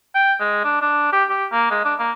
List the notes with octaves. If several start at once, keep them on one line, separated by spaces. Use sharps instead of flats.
G5
G#3
D4
D4
G4
G4
A#3
G#3
D4
A#3